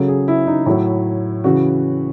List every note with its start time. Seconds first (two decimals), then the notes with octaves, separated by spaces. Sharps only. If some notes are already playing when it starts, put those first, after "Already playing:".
Already playing: C#3 F#3 A4
0.08 G#4
0.28 E4
0.47 D#4
0.66 A2 F#3 E4
1.44 C#3 E3 F#4